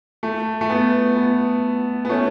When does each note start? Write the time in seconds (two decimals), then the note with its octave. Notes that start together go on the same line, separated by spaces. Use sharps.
0.23 A3
0.61 A3
0.70 B3
1.16 B3
2.05 B3
2.09 A3 C#4